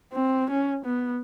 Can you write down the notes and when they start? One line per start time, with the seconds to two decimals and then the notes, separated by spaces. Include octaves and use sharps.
0.13 C4
0.50 C#4
0.85 B3